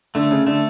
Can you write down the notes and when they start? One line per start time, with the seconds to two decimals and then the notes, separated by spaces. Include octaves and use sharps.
0.15 D3 A3
0.31 C#3
0.47 D3 A3